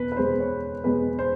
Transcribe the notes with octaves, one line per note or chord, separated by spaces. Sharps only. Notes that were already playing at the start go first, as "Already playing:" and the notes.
Already playing: E2 B2 B4
B4
E2 B2 G#3 C5
C#5
E2 B2 G#3 B4
C5